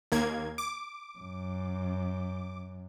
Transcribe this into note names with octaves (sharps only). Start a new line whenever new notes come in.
D#2 A#3 G#6
D6
F#2